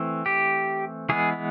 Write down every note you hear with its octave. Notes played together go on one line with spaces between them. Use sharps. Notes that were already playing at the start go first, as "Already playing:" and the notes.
Already playing: E3 A3 C4
G4
E3 G#3 B3 G#4